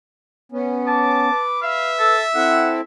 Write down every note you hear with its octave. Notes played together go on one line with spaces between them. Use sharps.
B3 C#4
A5 D6
B4
E5 F5
A4
C4 E4 A4 F#5